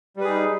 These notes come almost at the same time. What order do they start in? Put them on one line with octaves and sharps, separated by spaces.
G3 B4 G#4 D#4